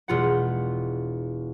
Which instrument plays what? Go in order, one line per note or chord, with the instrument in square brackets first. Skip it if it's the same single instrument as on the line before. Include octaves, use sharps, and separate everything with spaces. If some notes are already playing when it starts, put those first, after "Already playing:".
[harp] E1 F4 F#5